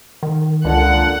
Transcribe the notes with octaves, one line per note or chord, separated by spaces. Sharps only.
D#3
C#2 A#2 D3 F#5